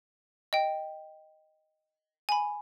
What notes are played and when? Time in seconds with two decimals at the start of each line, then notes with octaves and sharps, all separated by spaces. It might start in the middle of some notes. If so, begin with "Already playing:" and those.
0.53 D#5 G5
2.29 G#5 B5